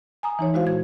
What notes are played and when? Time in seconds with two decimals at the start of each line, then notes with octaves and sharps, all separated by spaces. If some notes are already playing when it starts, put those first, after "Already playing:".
0.23 G#5 A#5 D#6
0.39 E3 D#4 C#5
0.54 G#3 E4 F#4 C5 F5
0.66 A#2 G#6